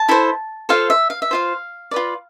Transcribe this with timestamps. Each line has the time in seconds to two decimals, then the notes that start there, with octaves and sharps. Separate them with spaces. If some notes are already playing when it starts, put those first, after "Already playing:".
Already playing: A5
0.09 E4 A4 C5
0.69 F4 A4 C5 F5
0.90 E5
1.10 F5
1.22 E5
1.31 F4 C5 F5
1.91 F4 B4 D5